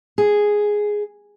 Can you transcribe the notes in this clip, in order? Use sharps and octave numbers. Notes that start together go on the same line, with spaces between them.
G#4